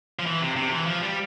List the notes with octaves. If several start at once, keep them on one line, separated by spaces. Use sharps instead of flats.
F3
E3
C3
C3
D3
E3
F3
G3